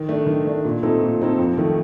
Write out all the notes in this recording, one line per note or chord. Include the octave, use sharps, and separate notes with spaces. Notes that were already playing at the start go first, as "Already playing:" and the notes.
Already playing: D#3
A3 D4
D#3
A3 D4
A#2
A3 C4 D#4 A4
A#2
A3 C4 D#4 A4
F2
D#3 A3